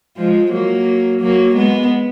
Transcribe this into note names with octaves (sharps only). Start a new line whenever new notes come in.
F3 G#3
F#3 A#3
F#3 A#3
G#3 B3